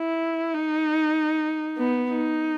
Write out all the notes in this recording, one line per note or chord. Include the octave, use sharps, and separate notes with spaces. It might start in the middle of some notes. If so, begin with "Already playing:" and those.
Already playing: E4
D#4
B3
D#4